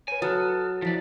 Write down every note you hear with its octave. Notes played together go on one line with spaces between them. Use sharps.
B4 C#5 G#5
F#3 A4 D#6 F6 F#6
F3 E4 D5 B6